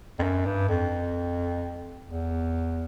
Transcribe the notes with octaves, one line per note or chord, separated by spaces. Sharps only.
F2
F#2
G2
F2
E2